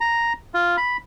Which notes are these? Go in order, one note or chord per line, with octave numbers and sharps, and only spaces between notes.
A#5
F4
B5